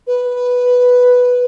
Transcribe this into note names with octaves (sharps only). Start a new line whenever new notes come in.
B4